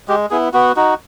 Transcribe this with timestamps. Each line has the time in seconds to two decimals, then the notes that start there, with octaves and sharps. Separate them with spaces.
0.08 G#3 G4
0.30 B3 E4 G#4
0.53 B3 F#4
0.76 D#4 F#4